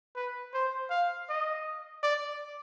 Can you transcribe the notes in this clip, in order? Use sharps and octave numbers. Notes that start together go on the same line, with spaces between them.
B4
C5
F5
D#5
D5